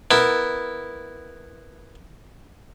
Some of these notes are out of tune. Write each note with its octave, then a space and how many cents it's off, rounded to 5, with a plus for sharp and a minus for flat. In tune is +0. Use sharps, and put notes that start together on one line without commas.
B3 +0 E4 +0 A#4 +0